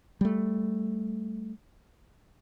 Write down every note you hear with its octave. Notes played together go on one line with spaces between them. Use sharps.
G3 A3